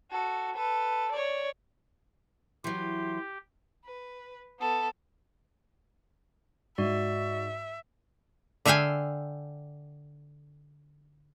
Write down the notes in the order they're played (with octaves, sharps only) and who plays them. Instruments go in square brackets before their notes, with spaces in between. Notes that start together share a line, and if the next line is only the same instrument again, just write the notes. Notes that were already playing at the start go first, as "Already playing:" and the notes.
[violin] F#4 A4
A4 B4
C#5 D5
[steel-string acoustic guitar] E3 F#3 [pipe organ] G4 [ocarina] C6
[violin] B4
B3 A4
[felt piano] G#2 [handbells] F#4 D5 [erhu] E5
[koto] D3 E5 F5 G5 G#5